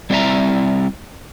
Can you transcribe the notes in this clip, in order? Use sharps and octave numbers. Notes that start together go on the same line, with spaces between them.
G3 C4 E4 D5 E5 A#5